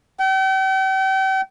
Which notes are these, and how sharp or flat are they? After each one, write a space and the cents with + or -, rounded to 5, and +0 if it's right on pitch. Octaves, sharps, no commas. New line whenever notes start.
G5 -40